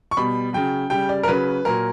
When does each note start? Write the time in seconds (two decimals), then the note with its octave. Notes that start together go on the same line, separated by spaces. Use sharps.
0.11 C#6
0.17 B2 G3 B5
0.53 C#3 F#3 G5
0.90 C#3 G3 G5
1.09 D5
1.23 A#4
1.28 C#3 F#3 B4
1.65 A#2 F#3 A#4